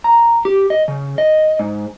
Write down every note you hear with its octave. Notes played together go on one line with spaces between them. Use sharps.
A#5
G4
D#5
C#3
D#5
G#2